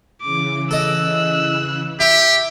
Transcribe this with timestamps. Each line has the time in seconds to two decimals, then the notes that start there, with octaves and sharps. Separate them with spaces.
0.22 C#3 E3 D6
0.71 A4 D#5 E6 F#6
2.00 E4 G4